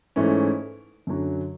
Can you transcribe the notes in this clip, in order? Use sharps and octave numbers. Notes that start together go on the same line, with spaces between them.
G#2 E3 A3 C#4 E4
F#2 D3 F#3